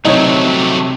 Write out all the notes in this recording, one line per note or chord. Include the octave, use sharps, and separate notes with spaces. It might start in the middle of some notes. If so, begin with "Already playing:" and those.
C3 F#3 A3 C4 D#4 C#5